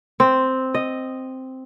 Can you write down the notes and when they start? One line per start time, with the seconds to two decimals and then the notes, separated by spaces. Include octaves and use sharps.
0.20 C4
0.75 D#5